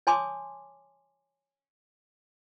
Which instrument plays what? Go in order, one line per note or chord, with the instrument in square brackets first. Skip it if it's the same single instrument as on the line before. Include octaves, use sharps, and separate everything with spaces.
[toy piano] C#5 G#5 A5 C6 D6 D#6